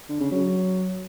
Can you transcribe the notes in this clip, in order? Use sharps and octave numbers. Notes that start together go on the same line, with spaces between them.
D3
C#3
F#3